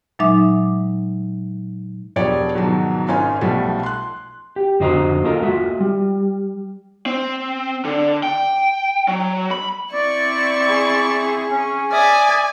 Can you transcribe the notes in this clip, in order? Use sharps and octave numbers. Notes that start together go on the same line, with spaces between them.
A#2 F#3 G#3 D#4 E5 D6
E1 F3 G4 C#5 D5
G#2 B2 D#3 F3 F#3
G#1 C#4 D#4 F4 G#5
B1 B2 F3 G3 A3
C6 F#6
G4
F2 D3 F#4 C5 D#5 A#5
A#3 F4 A4 A#4 D#5 A#5
G#3 F4 F#4 E5
G3
C4
D3
G5
F#3
B5
C4 E4 D5 C#6
G#4
C#4
D5 E5 G#5 D#6